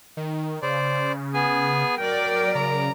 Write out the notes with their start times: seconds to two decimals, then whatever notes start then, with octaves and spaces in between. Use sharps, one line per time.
0.17 D#3
0.62 C#3 C5 D5
1.34 B3 G#4 G#5
1.98 F#3 A#4 D5 G5
2.55 C#3 A#5